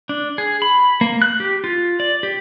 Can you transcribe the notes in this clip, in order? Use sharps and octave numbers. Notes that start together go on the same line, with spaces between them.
D4
G#4
B5
A#3
F#6
G4
F4
D5
G4